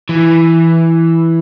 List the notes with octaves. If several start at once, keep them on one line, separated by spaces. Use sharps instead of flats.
E3